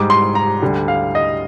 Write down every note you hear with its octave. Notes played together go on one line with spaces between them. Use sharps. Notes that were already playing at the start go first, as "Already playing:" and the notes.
Already playing: G#2 G3 D6
C6
A#5
D2 D3 G3
F5
D#5